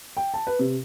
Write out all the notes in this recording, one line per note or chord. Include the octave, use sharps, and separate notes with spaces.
G5
A5
B4
C3